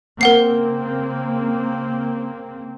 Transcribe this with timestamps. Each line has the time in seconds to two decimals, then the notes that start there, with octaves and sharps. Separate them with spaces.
0.21 C#3 A#3 C4 A#4 F#5 C7